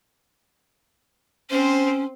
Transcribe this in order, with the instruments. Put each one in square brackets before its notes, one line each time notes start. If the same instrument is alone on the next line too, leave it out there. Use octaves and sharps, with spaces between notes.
[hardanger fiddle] C4 C5 [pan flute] C#4